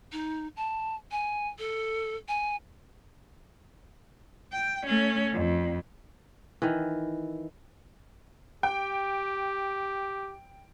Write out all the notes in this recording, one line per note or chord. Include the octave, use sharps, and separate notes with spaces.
D#4
A5
G#5
A4
G#5
G5
A3 C#4
F2
D#3 E3
G4 G5